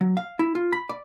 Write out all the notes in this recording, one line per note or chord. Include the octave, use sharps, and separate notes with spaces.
F#3
F5
E4
F4
B5
D5